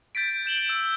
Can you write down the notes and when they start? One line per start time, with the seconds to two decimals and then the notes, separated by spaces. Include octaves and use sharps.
0.15 G6 A6 B6 D7
0.46 G6 E7 F#7 G7
0.69 E6